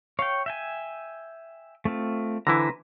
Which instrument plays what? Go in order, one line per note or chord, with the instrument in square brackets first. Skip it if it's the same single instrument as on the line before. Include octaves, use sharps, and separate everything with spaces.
[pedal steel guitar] C#5 G5 [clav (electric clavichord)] F5
[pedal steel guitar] E5 G5 G#5
A3 C4 F4
[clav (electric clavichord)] D3 E3 E4 [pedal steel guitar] B4 C5 A#5